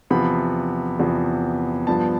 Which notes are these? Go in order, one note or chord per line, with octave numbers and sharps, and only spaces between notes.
E2 C3 F3 B3 B5
E2 C3 F3 B3
G2 F3 B3 A5